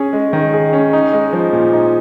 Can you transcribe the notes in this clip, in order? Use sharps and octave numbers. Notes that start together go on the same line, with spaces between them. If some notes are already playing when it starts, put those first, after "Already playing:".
Already playing: C#4 G#4
G#3
D#3
G#4
C#4
D#4
G#3
F3
A#2
D#4